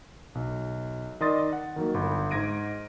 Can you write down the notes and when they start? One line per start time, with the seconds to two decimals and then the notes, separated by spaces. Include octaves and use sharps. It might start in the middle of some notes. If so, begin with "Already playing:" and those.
0.35 B1
1.21 D#3 D5 D#5 C6 D#6 A6
1.53 F#5
1.76 D#3 F#3 A#3
1.94 G1 B5
2.31 G#2 G#6 A#6 D7 D#7